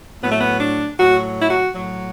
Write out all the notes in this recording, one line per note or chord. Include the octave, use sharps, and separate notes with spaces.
A2 F#3 B3
A3
B3
D4
A2 F#3 F#4
E4
F#4
A2 F#3